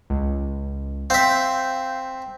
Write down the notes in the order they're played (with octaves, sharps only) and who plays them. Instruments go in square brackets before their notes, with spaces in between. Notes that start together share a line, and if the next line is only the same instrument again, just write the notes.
[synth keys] C#2
[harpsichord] C4 E5 [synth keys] F5 G6